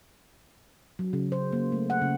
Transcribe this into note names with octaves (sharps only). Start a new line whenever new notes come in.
F#3
C#3
C5
A#3
A3
F#5
C#3